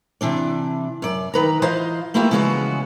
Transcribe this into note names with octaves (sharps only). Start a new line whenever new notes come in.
C3 E3 D4 D5
F#2 D5
D#3 B4 A#5
E3 F4 C5 D#5 F5
A3 A#3 E4 F4 G4 B4
C#3 E3 F3 G#3 B3 F#4